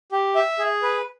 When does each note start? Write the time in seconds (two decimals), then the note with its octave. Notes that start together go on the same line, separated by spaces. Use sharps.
0.12 G4
0.35 E5
0.59 G#4
0.82 B4